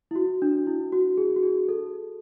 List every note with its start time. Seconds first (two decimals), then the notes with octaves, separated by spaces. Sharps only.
0.11 E4
0.15 F#4
0.42 D4
0.67 E4
0.92 F#4
1.18 G#4
1.36 F#4
1.43 G#4
1.69 A4